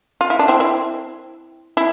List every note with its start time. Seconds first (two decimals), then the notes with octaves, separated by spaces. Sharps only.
0.21 F4
0.30 E4
0.39 D4
0.48 C4 E4
0.60 C4 E4
1.77 E4